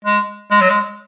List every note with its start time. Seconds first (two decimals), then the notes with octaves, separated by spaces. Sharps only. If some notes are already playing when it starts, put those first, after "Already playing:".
0.05 G#3
0.51 G#3
0.61 F#3
0.70 G#3